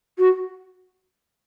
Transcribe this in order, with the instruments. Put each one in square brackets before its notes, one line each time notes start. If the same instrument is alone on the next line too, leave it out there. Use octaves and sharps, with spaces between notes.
[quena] F#4